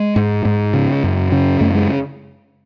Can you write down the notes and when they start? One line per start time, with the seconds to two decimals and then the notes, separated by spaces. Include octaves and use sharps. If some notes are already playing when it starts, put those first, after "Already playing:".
Already playing: G#3
0.16 G#2
0.45 G#2
0.74 C#3
1.03 F#2
1.32 C#3
1.61 F#2 A3
1.75 G#3